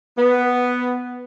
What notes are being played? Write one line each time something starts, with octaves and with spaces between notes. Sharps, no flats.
B3